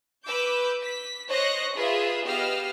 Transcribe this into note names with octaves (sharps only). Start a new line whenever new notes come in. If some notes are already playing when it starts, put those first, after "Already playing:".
B4 D6 E6 G6
B6
C5 C#5 D#5 C#6 F#6 A#6
F4 G#4 B4 E5 C6
B3 G4 D#5 F5 E6 F6